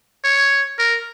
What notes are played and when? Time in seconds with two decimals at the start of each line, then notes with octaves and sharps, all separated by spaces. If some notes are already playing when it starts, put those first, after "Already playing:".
0.25 C#5
0.79 A#4